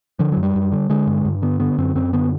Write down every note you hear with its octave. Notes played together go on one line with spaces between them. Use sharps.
D3 F3
F#2 F#3
G3
F#2
D3
D3 G#3
G2
G2
D3 B3
D3 B3
F#2 C4
F#2 C4
D3 B3